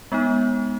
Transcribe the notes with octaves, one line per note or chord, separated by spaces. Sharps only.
G#3 B3 D#4